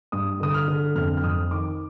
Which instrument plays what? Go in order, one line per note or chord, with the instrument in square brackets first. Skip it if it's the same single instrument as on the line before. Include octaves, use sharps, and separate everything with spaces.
[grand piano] G2 D#6
D3 D#6
F6
D3
F2 F6
F6
F2 D#6
D#3 D6